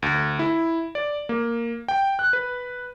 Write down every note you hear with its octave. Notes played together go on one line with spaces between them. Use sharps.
D2
E4
D5
A#3
G5
F#6
B4